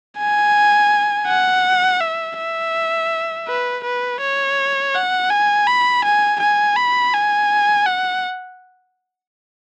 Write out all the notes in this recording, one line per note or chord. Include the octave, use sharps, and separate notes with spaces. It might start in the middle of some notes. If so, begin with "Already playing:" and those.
G#5
F#5
E5
E5
B4
B4
C#5
F#5
G#5
B5
G#5
G#5
B5
G#5
F#5